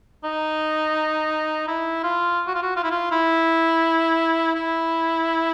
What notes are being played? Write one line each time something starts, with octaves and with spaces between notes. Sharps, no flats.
D#4
E4
F4
F#4
F4
F#4
F4
E4
F4
E4
E4